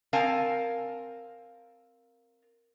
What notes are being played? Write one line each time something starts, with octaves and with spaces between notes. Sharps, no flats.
C4 A#4 F5 G#5 A5